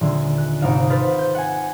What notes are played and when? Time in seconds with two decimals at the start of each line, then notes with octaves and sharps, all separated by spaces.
0.01 D#1 D3 G#3
0.38 F#6
0.60 G#1 C3 D#4 F5 D7 E7
0.90 B4 C5 F6 A6
1.19 G6
1.35 F#5 G#5